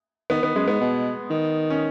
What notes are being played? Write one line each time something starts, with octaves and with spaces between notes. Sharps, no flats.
D#3 B3
D#3 B3
F#2 G#3
G#2 B3
B2
D#3
C#4